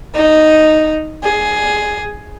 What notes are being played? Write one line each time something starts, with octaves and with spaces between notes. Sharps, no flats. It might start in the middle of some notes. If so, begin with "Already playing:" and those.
D#4
G#4